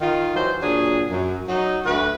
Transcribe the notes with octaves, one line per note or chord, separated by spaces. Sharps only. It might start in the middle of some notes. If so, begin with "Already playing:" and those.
D#3 F4
E3 F#3 D#4 C5
A#2 F#3 D4 G#4
F#2
F#3 D#4
D2 F#4 B4